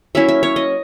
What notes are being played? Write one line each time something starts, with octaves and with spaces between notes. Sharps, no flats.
F#3 A#3 C#4 E4 E5
E5
C#5
D#5